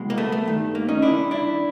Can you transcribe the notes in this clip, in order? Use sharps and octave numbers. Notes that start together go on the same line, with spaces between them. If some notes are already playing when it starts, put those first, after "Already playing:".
Already playing: C2 B2 G#3
A#3
A3 B3
A3
G2 D#3 G3
A#3
C#4 D#4
C2 C3 D#3 D4 E4
D4 E4